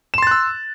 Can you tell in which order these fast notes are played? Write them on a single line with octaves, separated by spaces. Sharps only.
E7 C6 A6 F#6 E6